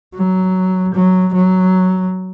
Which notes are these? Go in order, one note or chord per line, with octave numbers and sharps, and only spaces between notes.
F#3
F#3
F#3